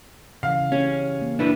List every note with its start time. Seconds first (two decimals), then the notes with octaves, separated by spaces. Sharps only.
0.43 C#3 E3 F5
0.72 C#4 G4
1.22 A#3
1.39 D4 E4 B4